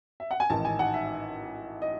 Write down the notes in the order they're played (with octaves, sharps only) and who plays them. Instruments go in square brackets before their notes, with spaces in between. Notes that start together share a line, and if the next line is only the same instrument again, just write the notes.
[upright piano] E5
F#5
G#5
A1 G#2 D#3 A5
G#5
F#5
E5
D#5